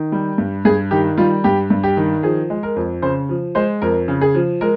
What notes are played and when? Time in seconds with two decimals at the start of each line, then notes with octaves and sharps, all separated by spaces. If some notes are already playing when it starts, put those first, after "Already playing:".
Already playing: D#3
0.12 G3
0.38 G2
0.65 G2 G#4
0.91 D#3 G4
1.18 G3 F4
1.44 G2 G4
1.70 G2
1.83 G4
1.97 D#3
2.23 F3 G#4
2.50 G#3
2.63 A#4
2.76 F2
3.02 C#3 C5
3.29 F3
3.55 G#3 C5
3.82 F2 A#4
4.08 C#3
4.21 G#4
4.35 F3
4.61 G#3 A#4